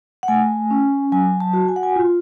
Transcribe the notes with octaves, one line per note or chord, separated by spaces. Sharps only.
F#5
A3 G#5
C#4
F#3 G#5
A5
F#4
G#5
F#5
G#5
F4